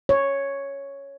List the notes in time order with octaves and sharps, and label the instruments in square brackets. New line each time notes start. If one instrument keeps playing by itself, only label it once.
[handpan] C#5